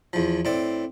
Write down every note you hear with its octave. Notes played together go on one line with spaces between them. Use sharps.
E2 F3
A2 C4 D5